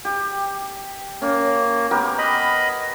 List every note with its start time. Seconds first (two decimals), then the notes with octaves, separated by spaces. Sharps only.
0.05 G4
1.22 A#3 C#4
1.91 B3 G4 A#4
2.18 D#5 B5